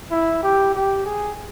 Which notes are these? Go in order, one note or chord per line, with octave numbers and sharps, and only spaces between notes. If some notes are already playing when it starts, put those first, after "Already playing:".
E4
G4
G4
G#4